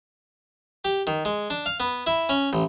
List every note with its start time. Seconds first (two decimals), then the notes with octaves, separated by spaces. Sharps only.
0.85 G4
1.07 D#3
1.25 G#3
1.50 D4
1.66 F5
1.80 B3
2.07 E4
2.29 C#4
2.53 A1